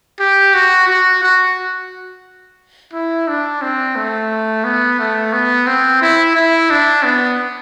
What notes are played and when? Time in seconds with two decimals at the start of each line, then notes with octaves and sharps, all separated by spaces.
0.20 G4
0.54 F#4
0.88 F#4
1.23 F#4
2.93 E4
3.28 D4
3.62 C4
3.96 A3
4.64 B3
4.99 A3
5.33 B3
5.67 C4
6.01 E4
6.35 E4
6.70 D4
7.04 B3